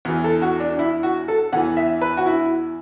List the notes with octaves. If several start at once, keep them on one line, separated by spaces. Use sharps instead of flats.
E2 E3
A4
F#4
D4
E4
F#4
A4
E2 E3 F#5
E5
B4
F#4
E4